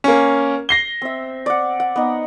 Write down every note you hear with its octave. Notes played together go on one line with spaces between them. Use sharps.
A#3 C#4
A#6 C7 G7
C4 E5
D5 F#5
F#5
B3 D#4